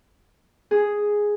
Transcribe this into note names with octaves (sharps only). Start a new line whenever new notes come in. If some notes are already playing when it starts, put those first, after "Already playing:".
G#4